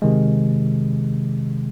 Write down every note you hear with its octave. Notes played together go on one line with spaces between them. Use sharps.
C3 D#3 G#3